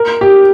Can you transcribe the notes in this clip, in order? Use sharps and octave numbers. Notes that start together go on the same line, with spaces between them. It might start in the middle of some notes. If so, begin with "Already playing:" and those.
Already playing: A#4
G4